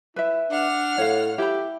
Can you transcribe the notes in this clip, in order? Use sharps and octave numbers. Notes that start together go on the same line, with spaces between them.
E4 B4 E5
D4 F#5 F6
A2 C#5 F5
E4 G4 B5